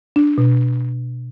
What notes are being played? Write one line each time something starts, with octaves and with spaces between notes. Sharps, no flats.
D4
B2